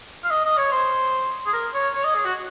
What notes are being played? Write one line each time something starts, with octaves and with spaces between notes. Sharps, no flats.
F5
D#5
D#5
C#5
C5
G#4
A#4
C#5
C#5
D#5
G#4
F#4